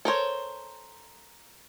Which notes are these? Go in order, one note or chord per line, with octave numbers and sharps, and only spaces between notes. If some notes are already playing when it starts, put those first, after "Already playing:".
A4 A#4 C5 C#5